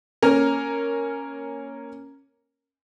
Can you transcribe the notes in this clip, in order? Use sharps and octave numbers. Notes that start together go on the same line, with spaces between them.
A#3 C#4 A#4